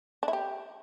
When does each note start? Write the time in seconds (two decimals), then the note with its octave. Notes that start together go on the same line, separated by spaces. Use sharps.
0.23 D4
0.28 E4
0.33 G4